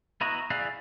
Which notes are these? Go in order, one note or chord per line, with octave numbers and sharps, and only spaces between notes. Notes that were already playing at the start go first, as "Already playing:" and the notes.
B3 E4 F#4 D#5 A#5
E4 G#4 D5 F5 F#5